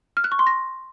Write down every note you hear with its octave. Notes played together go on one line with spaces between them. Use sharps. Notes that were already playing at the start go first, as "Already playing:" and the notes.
F6
F#6
C#6
C6
A#6